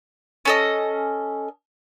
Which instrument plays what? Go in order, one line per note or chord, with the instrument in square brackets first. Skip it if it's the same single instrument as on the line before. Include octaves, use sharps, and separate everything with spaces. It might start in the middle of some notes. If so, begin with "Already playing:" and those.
[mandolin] C#4 A4 D#5